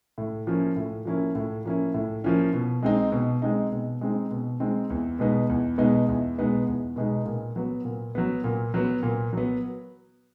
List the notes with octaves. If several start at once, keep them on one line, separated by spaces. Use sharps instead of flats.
A2
F3 A#3 C#4 E4
A2
F3 A#3 C#4 E4
A2
F3 A#3 C#4 E4
A2
F3 A#3 C#4 E4
B2
G#3 C4 D#4
B2
G#3 C4 D#4
B2
G#3 C4 D#4
B2
G#3 C4 D#4
E2
B2 G#3 B3 D#4
E2
B2 G#3 B3 D#4
E2
B2 G#3 B3 D#4
E2
B2 G#3 B3 D#4
A#2
F#3 B3
A#2
F#3 B3
A#2
F#3 B3
A#2
F#3 B3